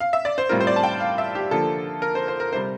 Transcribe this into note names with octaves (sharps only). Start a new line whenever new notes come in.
F5
E5
D5
C5
A2 G3 C4 F4 A#4
C5
D5
A5
G5
F5
E5
G4
D3 F3 A#3 F4 A4
A#4
C5
C5
A#4
C3 G3 C5